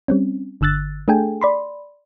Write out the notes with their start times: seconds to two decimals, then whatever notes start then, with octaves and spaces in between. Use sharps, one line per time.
0.08 G3 C4 C#4
0.61 G1 D3 E6 F#6 A6
1.08 A3 D4 G#4 A4 G5 G#5
1.41 D5 B5 C6